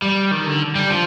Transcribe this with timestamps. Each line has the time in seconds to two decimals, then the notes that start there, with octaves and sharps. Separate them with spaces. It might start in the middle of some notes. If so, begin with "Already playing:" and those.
0.02 G3
0.31 D#3
0.46 D3
0.75 G3
0.90 F3